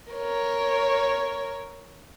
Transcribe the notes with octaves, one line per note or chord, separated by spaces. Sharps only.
A#4 C#5